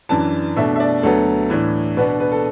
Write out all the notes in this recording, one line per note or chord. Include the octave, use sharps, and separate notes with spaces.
F#2 E3 D4 A5
B2 A3 D4 E5
E5
D5
D2 D3 F#3 B3 A4
A2 E3 D4
B2 B3 D4 B4
B4
A4